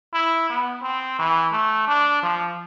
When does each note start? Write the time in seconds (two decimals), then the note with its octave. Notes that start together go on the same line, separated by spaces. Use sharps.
0.13 E4
0.50 B3
0.82 C4
1.19 E3
1.52 A3
1.88 D4
2.23 F3